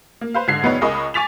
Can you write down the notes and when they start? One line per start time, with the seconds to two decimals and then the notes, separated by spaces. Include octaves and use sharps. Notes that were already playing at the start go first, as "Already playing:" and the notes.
0.21 A#3
0.34 B4 C5 F5
0.48 G#2 D3 G#6 C7
0.63 F1 B3 D#4 B4 C#5
0.81 C#2 G#4 A#4 D#5 B5 C#6
1.14 G#5 C#6 D6 A6 B6 F7